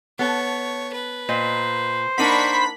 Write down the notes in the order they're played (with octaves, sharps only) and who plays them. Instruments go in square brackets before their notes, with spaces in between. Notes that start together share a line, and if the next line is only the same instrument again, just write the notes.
[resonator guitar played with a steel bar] B3 A4 [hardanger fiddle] C#5
[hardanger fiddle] B4
[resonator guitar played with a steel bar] A#2 D#5 [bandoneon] C5
[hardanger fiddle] A#3 C#6 [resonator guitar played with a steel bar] D4 D#4 F#5 [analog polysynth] B5 B6